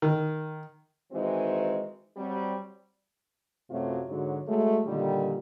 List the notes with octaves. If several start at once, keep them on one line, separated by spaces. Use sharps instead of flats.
D#3
D#3 E3 G#3 C4 D#4 F#4
F#3 G3 C4
F#2 C3 F#3 A3 F4
G#2 D3 F#3
F#3 G#3 A3
A#2 D3 D#3 G3